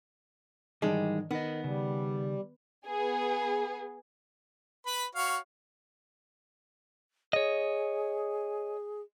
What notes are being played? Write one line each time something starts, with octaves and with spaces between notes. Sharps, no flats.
G#2 D#3 E3 G3 G#3
D#3 B3 A#4 D#5
C#3 G3
B3 G#4
B4 B5
F#4 C#5 F5
G#4 C#5 D#5